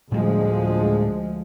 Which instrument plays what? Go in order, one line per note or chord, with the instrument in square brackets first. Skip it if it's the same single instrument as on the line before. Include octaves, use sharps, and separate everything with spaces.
[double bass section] D2 F3 G#3 [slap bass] A2 G3 A#3